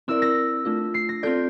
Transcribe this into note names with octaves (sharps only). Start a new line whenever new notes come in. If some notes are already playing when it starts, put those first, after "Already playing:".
C4 E4 A#4 D5 E6
A#6
A3 D4 F4
C7
A#6
C4 F4 A4 D5 G6